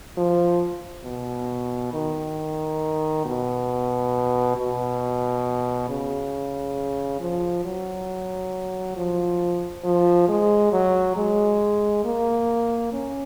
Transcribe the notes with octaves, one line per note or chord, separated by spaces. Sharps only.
F3
B2
D#3
B2
B2
C#3
F3
F#3
F3
F3
G#3
F#3
G#3
A#3
C#4